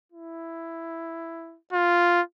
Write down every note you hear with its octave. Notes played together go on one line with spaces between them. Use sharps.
E4
F4